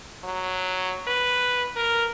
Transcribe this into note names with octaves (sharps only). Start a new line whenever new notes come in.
F#3
B4
A#4